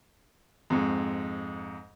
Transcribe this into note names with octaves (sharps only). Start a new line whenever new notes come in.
F2 G#2